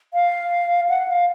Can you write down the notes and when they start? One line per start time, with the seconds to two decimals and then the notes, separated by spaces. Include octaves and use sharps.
0.14 F5
0.89 F#5
1.08 F5